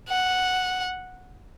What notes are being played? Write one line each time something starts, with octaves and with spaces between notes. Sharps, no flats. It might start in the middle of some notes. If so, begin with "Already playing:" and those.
F#5